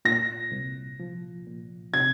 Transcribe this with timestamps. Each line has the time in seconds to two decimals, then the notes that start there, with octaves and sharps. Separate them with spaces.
0.05 A#2 A#6
0.51 C2
1.00 F3
1.47 A#2
1.94 C3 G#6